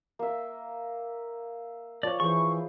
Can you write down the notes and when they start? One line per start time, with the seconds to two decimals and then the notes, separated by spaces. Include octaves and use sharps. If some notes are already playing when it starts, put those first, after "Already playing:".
0.19 A#3 E5
2.03 F3 C#5 D5
2.20 E3 G#4 C5 C#6